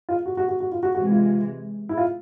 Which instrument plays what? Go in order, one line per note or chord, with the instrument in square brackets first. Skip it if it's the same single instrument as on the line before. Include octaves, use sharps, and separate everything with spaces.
[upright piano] F4
F#4
F#4
F#4
F#4
F4
F#4
[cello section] C3 E3 G#3 [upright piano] F#4
[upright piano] F4
E4
F4